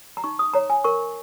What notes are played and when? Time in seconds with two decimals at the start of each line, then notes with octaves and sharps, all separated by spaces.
0.17 A#5
0.24 D#4 C#6
0.39 D#6
0.53 C#5 A#5
0.70 G#5
0.84 A#4 C#6